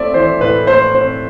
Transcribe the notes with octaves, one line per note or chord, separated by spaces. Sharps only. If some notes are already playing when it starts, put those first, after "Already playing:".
Already playing: A3 C4 D5 E5
E3 C5
A2 B4
A3 C5
C4 C5